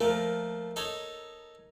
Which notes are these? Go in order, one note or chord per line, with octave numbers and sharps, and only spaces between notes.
F3 A3 A#4
D#4 A4 C#5